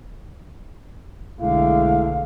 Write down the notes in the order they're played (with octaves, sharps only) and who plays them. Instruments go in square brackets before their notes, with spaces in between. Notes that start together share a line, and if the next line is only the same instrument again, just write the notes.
[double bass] B1 D3 [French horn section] G#3 A3 E4 [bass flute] F5